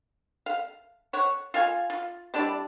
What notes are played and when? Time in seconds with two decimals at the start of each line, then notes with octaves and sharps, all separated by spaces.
0.46 F5
1.13 C#5 F#5
1.54 F4 F5 G#5
1.90 F4
2.34 G3 D4 E4 D5